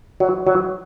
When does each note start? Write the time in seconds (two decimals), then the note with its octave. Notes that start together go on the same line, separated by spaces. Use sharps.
0.20 F#3
0.47 F#3